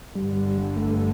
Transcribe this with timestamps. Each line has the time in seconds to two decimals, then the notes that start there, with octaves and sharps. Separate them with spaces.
0.15 G1 G2 D3 G3
0.76 A3